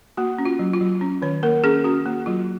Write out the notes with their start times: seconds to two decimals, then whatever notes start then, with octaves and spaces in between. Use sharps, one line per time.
0.17 A#3 F#4
0.38 C#4
0.45 F4
0.59 F#3
0.73 F4
0.81 F#3
1.01 C#4
1.22 D#3 C#5
1.43 A#3 A#4
1.64 C#4 G#4
1.84 C#4 F#4
2.06 A#3
2.26 F#3 F4